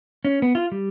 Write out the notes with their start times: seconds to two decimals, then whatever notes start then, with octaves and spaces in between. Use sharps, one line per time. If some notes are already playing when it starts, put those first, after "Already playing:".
0.25 C#4
0.42 B3
0.55 F4
0.72 G3